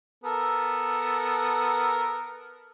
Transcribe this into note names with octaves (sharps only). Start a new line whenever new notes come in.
B3 A4 A#4